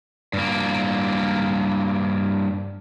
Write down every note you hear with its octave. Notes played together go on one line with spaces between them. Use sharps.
G2 A#3